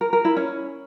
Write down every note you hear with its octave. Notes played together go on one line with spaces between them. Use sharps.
A#4
A#4
E4
C#4